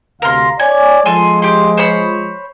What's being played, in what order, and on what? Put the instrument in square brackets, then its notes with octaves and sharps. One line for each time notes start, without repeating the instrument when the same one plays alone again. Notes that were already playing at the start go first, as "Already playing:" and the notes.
[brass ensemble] D2 C3 F5 [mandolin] A#4 C6
[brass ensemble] C#5 D5 [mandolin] G#5
[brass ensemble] F3 G#3 [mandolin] A4 G#5 C6
[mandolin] G4 C6
C5 C#5 B5